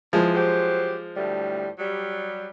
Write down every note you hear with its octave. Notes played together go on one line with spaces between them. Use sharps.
E2 E3 F3 G#3 G#4
F#3 G4 C5
D2 A2 G3
F#3 G3